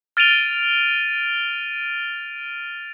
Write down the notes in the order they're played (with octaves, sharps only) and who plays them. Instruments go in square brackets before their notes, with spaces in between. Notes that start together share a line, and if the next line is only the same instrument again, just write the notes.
[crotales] F6 A6 D7 D#7 F7 G7